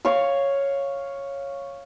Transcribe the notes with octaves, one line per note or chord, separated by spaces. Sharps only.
C#5 F5